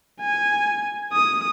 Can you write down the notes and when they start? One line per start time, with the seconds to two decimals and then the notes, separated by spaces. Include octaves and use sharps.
0.21 G#5
1.13 D#6